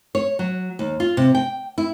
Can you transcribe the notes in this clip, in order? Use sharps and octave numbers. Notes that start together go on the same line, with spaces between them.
C#5
F#3
D#2
F4
C3
G5
E4